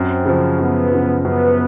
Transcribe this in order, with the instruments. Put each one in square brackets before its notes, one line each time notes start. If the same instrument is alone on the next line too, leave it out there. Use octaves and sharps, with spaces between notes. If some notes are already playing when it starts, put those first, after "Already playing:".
Already playing: [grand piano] F#2 [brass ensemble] C4
[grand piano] C#3 F3
[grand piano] F#2 [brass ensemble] B3
[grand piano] C#3 F3
[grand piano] F#2 [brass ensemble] B3